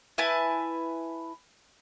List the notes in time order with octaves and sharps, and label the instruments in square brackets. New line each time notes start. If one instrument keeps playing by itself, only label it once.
[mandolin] E4 B4 G#5 A5